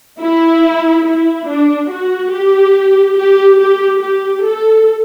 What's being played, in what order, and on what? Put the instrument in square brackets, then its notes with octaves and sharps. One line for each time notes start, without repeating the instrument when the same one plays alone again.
[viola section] E4
E4
D4
F#4
G4
G4
G4
G4
A4